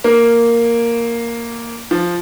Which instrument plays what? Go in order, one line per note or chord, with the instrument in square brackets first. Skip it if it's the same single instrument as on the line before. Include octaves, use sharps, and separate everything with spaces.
[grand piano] A#3
F3